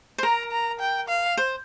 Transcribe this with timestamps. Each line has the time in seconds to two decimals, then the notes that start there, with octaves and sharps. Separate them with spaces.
0.18 C5
0.23 A#4 A#5
0.51 A#5
0.80 G5
1.09 F5
1.37 C5